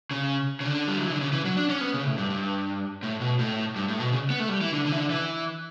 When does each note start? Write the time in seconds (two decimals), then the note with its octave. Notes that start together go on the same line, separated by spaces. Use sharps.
0.11 C#3
0.60 C#3
0.65 D3
0.88 G3
0.96 F#3
1.05 E3
1.12 D3
1.21 C#3
1.33 E3
1.45 F#3
1.57 D4
1.69 C#4
1.81 B3
1.94 C#3
2.06 A2
2.18 G2
2.30 G2
3.03 A2
3.21 B2
3.39 A2
3.76 G2
3.88 A2
4.00 B2
4.12 C#3
4.30 B3
4.40 A3
4.49 G3
4.61 E3
4.73 D3
4.86 D3
4.92 E3
4.97 D3
5.10 E3